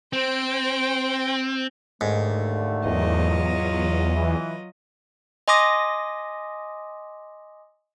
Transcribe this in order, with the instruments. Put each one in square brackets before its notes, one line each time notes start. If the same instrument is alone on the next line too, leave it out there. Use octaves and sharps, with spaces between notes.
[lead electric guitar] C4 [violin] C5 G5
[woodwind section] D#2 D3 A3 [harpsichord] G#2
[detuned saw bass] E2 [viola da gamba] F#3 F4 D#5
[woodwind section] E3
[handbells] D#5 G#5 C6 D6 D#6 A#6